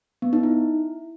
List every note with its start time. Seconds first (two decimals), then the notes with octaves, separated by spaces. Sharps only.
0.22 B3
0.33 D#4
0.43 E4